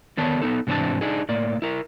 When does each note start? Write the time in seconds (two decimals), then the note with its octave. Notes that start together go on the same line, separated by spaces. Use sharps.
0.17 D3 D#3 B3 D4 C#5 A5
0.41 B3 D#4 A4
0.67 G#2 C3 E3 C4 D4 A5
1.01 D4 D#4 G#4
1.29 A2 A#3 D5
1.62 E4 A#4